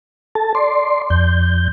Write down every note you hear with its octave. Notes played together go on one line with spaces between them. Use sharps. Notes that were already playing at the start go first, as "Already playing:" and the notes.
A4 A5
D5 C6
F2 G6